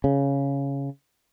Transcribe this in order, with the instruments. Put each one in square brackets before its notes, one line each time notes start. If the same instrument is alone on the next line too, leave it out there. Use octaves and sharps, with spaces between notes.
[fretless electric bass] C#3